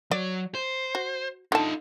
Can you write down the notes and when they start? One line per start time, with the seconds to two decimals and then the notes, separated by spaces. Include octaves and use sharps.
0.11 F#3 D5
0.55 C5
0.95 F#4
1.52 D3 D#4 F4 A5